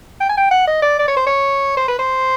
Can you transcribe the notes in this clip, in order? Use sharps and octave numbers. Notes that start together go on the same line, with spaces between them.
G5
G#5
G5
F#5
D#5
D5
D5
C#5
C5
C#5
C5
B4
C5